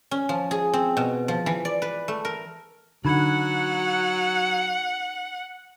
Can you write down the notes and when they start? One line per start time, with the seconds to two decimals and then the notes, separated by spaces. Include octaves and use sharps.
0.11 C#4
0.29 F3
0.51 G#4
0.74 C4
0.97 B2
1.28 F3
1.46 E3
1.65 D5
1.82 B4
2.08 A3
2.25 A#4
3.05 D3 F#3 D#4 F#5 B5 G#6